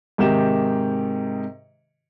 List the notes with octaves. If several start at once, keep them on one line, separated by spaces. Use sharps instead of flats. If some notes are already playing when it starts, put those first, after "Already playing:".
G#2 C3 D#3 G4 E7